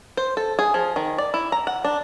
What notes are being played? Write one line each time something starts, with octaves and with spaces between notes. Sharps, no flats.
C5
A4
G#4
F3
D#3
D5
E4
A#5
F#5
D4